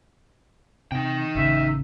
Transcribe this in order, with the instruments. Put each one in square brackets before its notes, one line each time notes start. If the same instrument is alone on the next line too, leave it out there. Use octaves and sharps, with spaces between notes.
[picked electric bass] C3 [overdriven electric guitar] D#4 G5
[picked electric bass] A1 C#3 [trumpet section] E5